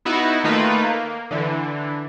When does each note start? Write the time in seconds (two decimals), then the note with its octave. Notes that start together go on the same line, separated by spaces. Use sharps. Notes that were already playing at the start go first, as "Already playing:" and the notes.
0.05 B3 D#4 E4 F#4
0.44 D#3 A3 A#3 D#4 F4 B4
0.83 A#3
1.31 D3 E3